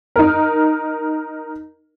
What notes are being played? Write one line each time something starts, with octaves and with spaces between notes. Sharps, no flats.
D#4 A#4